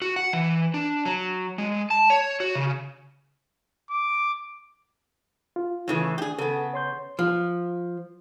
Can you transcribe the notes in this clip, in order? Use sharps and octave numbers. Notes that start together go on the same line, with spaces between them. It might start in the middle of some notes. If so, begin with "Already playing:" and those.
F#4
F#5
E3
D4
F#3
G#3
A5
C#5
F#4
C#3
D6
F4
A2 C#3 E3
D4 G4 G#4
C#3 B3 A4
C#5 C6 G6
F3